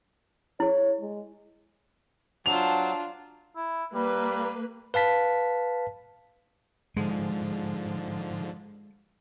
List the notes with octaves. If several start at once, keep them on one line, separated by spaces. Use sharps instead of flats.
E4 G#4 C#5
G#3
F#3 D4 F4 C5 A5 F7
E4
G3 A#3 B4
B4 F5 A5 B6
G#2 D3 F3 G#3